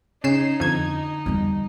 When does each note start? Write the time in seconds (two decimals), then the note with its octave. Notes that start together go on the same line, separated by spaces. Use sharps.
0.24 C#3 C#4 D#4 C7 E7
0.60 F2 D3 G#6
1.26 E2 G3